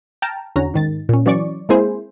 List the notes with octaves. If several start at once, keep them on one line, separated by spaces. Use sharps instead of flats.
G5 A5 A#5 F6
E2 D3 C#4 F#4 A#5
G#2 D#3 A6
A#2 C#4
E3 F#3 C#4 D5 C#6 D6
G#3 A#3 C4 E4 G#4 C5